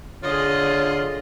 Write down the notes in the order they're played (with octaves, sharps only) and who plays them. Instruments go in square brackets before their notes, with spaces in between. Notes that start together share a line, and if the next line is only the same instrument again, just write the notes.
[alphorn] D3 [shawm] F4 [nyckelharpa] G#4 D#5 [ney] C#5